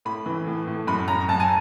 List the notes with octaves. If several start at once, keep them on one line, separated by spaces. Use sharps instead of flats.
A2 B5
E3
A2
A2
F#2 B5
F#2 A#5
F#2 A5
G#5